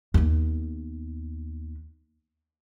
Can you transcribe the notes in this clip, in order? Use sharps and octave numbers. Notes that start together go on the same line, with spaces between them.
D#2 B3